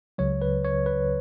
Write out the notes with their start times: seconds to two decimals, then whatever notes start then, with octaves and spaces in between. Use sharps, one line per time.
0.18 C#2 C#3 F#3 C#5
0.42 B4
0.65 C#5
0.86 B4